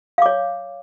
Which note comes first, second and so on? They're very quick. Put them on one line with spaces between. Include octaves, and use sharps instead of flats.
F5 D6 C#5